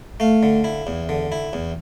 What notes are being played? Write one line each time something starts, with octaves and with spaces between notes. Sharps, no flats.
A3 F5
D3
E4
E2
D3
E4
E2